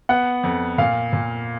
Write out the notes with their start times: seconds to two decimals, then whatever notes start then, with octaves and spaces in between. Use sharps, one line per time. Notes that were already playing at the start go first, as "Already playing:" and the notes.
0.09 B3 F#5
0.43 F2
0.78 A#2 F5
1.13 A#2